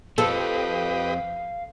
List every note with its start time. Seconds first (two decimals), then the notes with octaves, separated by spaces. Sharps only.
0.18 F3 C4 G4 A4 B4 D#5 F5